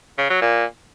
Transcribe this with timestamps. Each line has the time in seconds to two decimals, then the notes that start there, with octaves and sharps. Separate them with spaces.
0.18 C#3
0.30 F#3
0.41 A#2